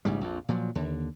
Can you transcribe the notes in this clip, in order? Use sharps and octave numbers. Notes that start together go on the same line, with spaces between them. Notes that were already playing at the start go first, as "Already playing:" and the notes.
A#1 G#2 C#3 G3
A#1 F2
A#2 F3 F#3
D#2 D3